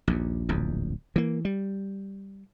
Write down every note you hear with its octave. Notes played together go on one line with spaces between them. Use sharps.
A#1 D#2
D1 A#1 E2
E3 A#3
G3